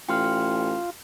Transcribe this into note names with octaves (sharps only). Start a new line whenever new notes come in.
A1 F4 G5 C6 F6